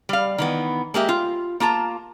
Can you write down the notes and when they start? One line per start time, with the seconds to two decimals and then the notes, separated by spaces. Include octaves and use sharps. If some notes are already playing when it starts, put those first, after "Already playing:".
0.09 G3 F5
0.38 D#3 E3 B3
0.94 G#3 A#3 G4 E5
1.09 F4
1.60 A#3 F4 A5 A#5